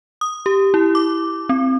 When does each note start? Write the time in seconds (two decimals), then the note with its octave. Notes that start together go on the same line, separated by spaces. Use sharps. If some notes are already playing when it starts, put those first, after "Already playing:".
0.21 D#6
0.46 G4
0.74 E4
0.95 D6
1.49 C4